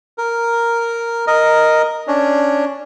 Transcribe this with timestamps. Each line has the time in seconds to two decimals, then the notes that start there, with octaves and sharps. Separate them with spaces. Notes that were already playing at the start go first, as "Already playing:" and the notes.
0.18 A#4
1.27 A#4 D#5
2.08 C#4 D4